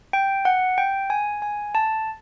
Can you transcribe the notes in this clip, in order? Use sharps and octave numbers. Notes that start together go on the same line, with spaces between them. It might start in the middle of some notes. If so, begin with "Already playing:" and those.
G5
F#5
G5
G#5
G#5
A5